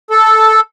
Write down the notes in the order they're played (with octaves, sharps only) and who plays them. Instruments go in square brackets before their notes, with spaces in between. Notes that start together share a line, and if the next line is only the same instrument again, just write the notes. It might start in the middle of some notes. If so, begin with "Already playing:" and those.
[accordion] A4